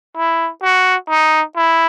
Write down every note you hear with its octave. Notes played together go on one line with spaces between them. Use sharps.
E4
F#4
D#4
E4